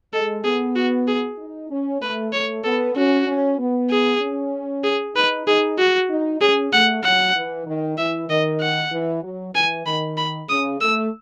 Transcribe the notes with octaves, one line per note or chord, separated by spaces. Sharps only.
G#3 A4
B3 G#4
F#4
G#4
D#4
C#4
A3 B4
A3 C#5
B3 A4
C#4 F#4
C#4
B3
G#4
C#4
G#4
D#4 B4
D#4 G#4
F#4
D#4
C#4 G#4
A3 F#5
F#3 F#5
E3
D#3
E3 E5
D#3 D#5
F#5
E3
F#3
E3 G#5
D#3 B5
B5
C#3 D#6
A3 E6